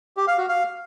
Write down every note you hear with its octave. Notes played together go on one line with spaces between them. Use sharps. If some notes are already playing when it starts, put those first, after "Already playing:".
G4
F5
F#4
F5